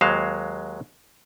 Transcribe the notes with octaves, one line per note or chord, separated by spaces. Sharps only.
D#2 F#3 G#3 C5 F5